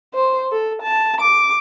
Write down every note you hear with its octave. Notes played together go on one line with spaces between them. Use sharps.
C5
A4
A5
D6